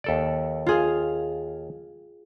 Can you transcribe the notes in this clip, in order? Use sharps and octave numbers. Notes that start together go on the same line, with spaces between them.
D#2 A4 D5
F4 G#4 F5